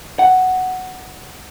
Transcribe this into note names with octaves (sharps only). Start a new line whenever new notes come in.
F#5